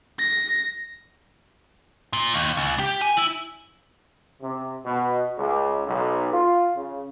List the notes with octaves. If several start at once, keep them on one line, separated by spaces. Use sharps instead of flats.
A#6
A#2
D#2
C#2
G4
G#5
E4
C3
B2
C#2
B1
F4
C#3